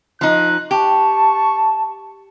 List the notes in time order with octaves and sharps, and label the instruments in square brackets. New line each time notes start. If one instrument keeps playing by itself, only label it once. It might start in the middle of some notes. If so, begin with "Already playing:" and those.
[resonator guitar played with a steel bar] F3 D#4 [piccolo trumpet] F#6
[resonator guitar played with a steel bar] G4 [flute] A5 [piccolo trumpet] C#6